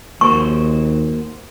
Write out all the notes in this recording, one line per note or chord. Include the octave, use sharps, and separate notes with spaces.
D#2 A#3 F#4 C5 C#6